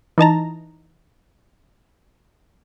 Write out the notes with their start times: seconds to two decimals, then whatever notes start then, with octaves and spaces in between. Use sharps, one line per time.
0.18 E3 D#4 A5 A#5